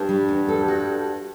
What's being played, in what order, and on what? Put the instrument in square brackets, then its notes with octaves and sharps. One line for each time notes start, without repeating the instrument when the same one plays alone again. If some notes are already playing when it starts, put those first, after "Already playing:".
Already playing: [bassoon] G2 [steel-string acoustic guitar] D4
[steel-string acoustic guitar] G3
E2
A4
F#4